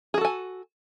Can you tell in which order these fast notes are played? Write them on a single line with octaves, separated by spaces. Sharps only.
G#4 F#4 A4 G#5